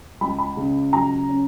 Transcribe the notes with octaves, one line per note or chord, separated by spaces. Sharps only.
C#2 B5
B5
C#3
F#3 A#5
C#4